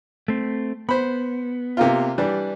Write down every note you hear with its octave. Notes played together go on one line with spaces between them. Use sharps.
A3 C4
B3 C5 B5
C3 A#3 F4
E3 G3 D4